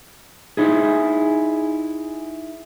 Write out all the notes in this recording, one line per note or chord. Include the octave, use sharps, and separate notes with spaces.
D#4 E4 G#4